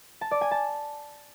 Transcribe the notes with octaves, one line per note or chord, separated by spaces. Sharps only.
A5
D5
G#5
A5